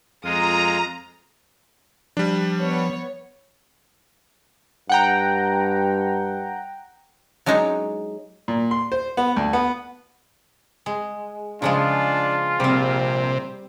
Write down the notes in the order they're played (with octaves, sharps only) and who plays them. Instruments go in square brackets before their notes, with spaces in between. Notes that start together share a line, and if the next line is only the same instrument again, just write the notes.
[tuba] F2 [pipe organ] G#3 F4 [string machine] A#5 [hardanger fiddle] D#6
[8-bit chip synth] F3 [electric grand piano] G3 D4
[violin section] B3 C#5
[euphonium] G2 [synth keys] F#5 G5 A#5
[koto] F#3 G#3 D4 D#4 G#4 C#5
[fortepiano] A#2
C6
C5
B3
D2
B3
[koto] G#3
[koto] C#3 F3 G#3 [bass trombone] D4 [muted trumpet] F4
[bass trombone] A#1 [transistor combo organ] C3 [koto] G3 C4